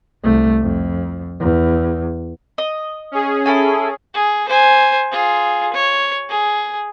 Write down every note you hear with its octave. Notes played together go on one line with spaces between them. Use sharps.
C2 A3
F2
E2
D#5
C#4 G#4
E4 A4 G#5
G#4
C5 G#5
F4 G#4
C#5
G#4